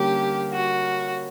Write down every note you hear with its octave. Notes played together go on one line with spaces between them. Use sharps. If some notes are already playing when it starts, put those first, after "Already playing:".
Already playing: D3 G3 A#3 C#4 G4
F#4